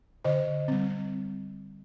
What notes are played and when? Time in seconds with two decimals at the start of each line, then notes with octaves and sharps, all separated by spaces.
0.24 D3 C5 D#5
0.68 G3 C4